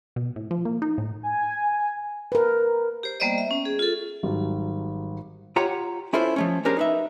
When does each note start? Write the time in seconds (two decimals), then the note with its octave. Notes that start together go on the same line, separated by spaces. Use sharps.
0.16 B2
0.36 A2
0.51 F3
0.65 A#3
0.82 D#4
0.98 A2
1.23 G#5
2.32 A#4 B4
3.03 G4 C5
3.20 G3 A#3 B3 C5 D5 D#5
3.38 E5
3.51 C#4
3.65 G#4
3.79 F4 A4
4.23 G#1 F#3 G3
5.56 F4 G4 C#5 F#5 G5 A#5
6.13 C#4 E4 F4 A4 C5 D5
6.36 F3 A3 C#4
6.65 C#4 D4 G4 G#4 A#4 C5
6.77 D#4 B4 E5